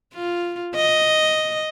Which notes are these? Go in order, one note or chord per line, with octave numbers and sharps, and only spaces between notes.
F4
D#5